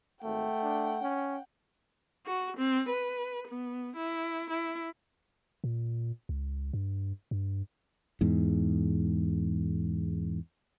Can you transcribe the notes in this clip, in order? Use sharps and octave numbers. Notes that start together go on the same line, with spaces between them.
G#1 A3 F#5 G5
D4
C#4
F#4
C4
B4
B3
E4
E4
A#2
C#2
G2
G2
E2 G#2